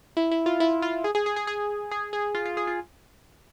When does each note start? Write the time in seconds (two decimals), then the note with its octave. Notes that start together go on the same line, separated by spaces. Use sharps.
0.17 E4
0.31 E4
0.46 F4
0.60 E4
0.82 F4
1.04 G#4
1.15 G#4
1.26 G#4
1.36 G#4
1.47 G#4
1.91 G#4
2.13 G#4
2.35 F4
2.45 F4
2.57 G#4
2.67 F4